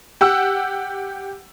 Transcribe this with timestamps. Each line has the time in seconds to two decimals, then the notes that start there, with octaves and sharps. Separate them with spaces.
0.21 G4 F#5 E6